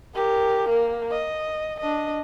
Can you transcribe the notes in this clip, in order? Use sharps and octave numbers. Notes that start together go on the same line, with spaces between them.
G4 A#4
A#3
D#5
D4 D#5